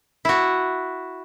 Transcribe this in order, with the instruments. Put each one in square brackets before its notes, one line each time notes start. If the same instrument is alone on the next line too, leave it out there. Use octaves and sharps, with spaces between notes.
[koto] E4 F#4